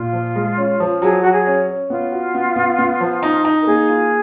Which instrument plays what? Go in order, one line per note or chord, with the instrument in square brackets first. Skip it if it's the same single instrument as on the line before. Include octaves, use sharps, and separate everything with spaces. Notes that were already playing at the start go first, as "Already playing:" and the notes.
Already playing: [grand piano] A#2 [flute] F4
[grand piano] F3
G#3
C#4
F3
[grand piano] F#3 [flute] G#4
[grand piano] F#3 [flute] F#4
[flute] G#4
[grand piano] C#4
C#4
[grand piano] B3 [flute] F4
[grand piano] F#4
B3
B3
B3
F3
D#4
D#4
[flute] A#4
[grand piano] A#3 [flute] G#4
[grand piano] F4